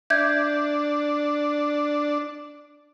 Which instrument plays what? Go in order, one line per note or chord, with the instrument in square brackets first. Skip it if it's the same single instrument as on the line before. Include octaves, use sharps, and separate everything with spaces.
[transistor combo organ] D4 [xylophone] E5 G6 G#6